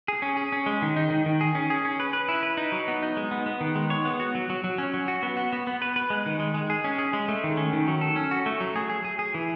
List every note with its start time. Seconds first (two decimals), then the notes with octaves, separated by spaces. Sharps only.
0.08 G#4
0.22 C#4
0.37 G#4
0.52 C#4
0.66 G#3
0.82 D#3
0.96 D#4
1.10 D#3
1.26 D#3
1.41 G#4
1.55 C#4
1.70 G#4
1.85 C#4
2.00 B4
2.13 B4
2.29 E4
2.43 B4
2.57 D#4
2.72 F#3
2.88 B3
3.03 D#4
3.17 G#3
3.31 B3
3.46 B3
3.61 D#3
3.76 G#3
3.90 C#5
4.05 B3
4.20 F#4
4.35 F#3
4.50 F#3
4.64 F#3
4.78 C#4
4.94 F#3
5.08 F#4
5.23 B3
5.37 F#4
5.53 B3
5.67 B3
5.82 B4
5.96 B4
6.10 G#3
6.26 D#3
6.40 G#3
6.54 G#3
6.70 G#4
6.84 C#4
6.99 G#4
7.13 G#3
7.28 A3
7.44 D#3
7.57 C#4
7.73 D#3
7.88 F#3
8.01 A4
8.16 C#4
8.31 F#4
8.46 A3
8.61 F#3
8.76 G#4
8.90 G#4
9.05 G#4
9.19 G#4
9.34 E3